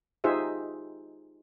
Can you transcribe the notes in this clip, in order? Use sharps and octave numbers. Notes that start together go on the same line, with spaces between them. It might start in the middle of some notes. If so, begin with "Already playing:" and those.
D#4 F4 G4 G#4 C5 E5